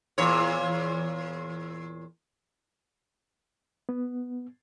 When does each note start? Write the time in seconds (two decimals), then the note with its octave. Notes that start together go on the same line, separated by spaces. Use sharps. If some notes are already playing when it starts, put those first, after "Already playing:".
0.18 E2 A#2 C#5
3.89 B3